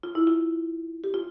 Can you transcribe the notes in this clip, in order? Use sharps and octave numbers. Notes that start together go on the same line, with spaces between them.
F4
E4
F4
G4
F4